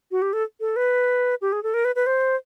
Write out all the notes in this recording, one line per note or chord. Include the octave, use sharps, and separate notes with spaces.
F#4
G4
A4
A4
B4
G4
G#4
A4
A#4
B4
B4
C5